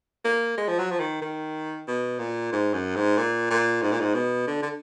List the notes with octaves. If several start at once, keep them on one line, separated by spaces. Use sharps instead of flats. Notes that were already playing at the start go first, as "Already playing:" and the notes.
A#3
G#3
F3
F#3
F3
D#3
D#3
B2
A#2
G#2
F#2
G#2
A#2
A#2
G#2
A#2
G#2
B2
D3
D3